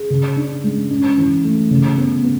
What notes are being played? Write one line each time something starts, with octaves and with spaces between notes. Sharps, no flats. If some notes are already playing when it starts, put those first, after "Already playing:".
Already playing: G#4
C#3
D4
G#3
C#4
E3
A3
C#3
B3
B3